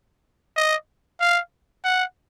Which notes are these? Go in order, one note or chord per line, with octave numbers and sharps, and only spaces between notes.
D#5
F5
F#5